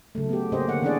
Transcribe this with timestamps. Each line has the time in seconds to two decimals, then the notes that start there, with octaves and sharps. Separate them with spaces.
0.15 C#3 F#3 A3
0.29 B3 G4
0.52 C#3 A#3 C#4 G4 C5 D#5
0.68 D3 A#3 F#5
0.82 D#3 E3 C#4 D4 G#4 D5